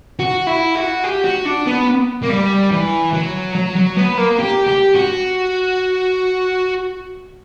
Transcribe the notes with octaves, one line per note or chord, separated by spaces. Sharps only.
F#4
E4
F#4
G4
F#4
D4
B3
A#3
G3
E3
F#3
F#3
F#3
B3
A#3
G4
G4
F#4